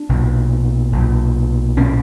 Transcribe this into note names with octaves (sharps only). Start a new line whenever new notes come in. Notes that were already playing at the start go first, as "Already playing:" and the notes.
Already playing: D4
B1 A#2
B1 A#2
B1 A#2 C#4